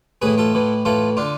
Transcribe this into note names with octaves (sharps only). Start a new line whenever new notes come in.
A2 E3 G#4 B4
F4 A4
A2 E3
A2 E3 F4 A4
D3 D4 F4